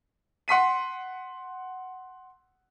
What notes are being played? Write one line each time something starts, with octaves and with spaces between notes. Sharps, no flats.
F#5 C6 B6 D#7